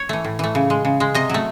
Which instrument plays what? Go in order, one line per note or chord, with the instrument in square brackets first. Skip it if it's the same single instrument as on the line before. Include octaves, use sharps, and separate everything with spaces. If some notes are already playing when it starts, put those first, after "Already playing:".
Already playing: [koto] C#5
E3 A3
A2
E3 A3
C#3
G#3
C#3
G#3
C3 D#5
F#3 A3